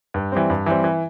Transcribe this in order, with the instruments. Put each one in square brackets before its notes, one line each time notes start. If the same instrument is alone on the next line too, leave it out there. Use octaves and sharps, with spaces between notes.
[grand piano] G2
E3 G3 C4
G2
E3 G3 C4
E3